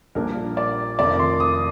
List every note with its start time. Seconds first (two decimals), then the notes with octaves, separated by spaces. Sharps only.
0.15 A#1 A#2 G3 D4 A#4
0.57 D5
0.99 F1 F2 D#3 D5
1.19 C6
1.40 D#6